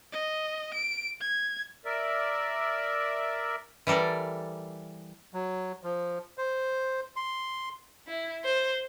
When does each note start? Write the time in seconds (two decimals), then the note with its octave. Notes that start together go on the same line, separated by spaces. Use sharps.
0.12 D#5
0.74 D7
1.21 G#6
1.85 A#4 D5 E5
3.87 E3 G3 A4 A#4 D5
5.34 F#3
5.84 F3
6.38 C5
7.16 C6
8.07 E4
8.44 C5